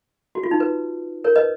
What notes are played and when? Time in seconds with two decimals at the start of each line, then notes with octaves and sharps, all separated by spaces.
0.35 F#4
0.43 F4
0.51 D#4
0.60 B4
1.24 A#4 C#5
1.36 B4 D#5